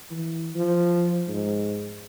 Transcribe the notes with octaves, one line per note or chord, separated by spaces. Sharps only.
E3
F3
G#2